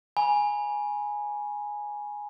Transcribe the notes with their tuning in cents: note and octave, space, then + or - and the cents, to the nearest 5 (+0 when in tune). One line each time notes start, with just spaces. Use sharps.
G#5 +0 B5 -35